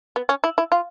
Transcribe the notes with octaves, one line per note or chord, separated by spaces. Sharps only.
B3
C#4
E4
E4
F4